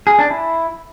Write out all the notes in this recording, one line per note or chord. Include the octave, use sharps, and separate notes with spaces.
G#4
D4
E4